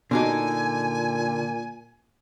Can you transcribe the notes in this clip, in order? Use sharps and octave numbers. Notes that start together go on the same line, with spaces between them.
A#2 D3 B3 D4 D#4 F#4 G#5